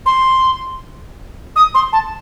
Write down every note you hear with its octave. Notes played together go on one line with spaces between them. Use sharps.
C6
D#6
C6
A5